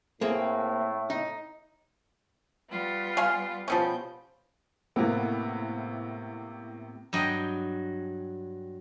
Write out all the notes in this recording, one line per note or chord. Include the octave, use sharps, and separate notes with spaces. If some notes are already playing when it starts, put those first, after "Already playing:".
A2 A#3 C4 G#4 E5
D#4
G3 B3 F4
F5 G#5 C6
B2 F3 G3 B3 C#4 G6
A2 C3 A#3 B3
G2 F#3 D#5 G5